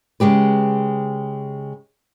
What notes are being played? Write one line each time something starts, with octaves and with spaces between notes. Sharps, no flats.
C#3 G#3 G4 B4